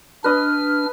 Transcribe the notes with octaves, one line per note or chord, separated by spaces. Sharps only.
D4 B4 D#5 F6